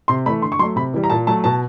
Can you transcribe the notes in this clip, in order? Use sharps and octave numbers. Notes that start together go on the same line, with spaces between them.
C3 C6
E3 A3 B5
D3 C6
C#6
F#3 A3 C6
C3 B5
E3 G3
A#5
A#2 A5
F#3 A3 A5
B2 A5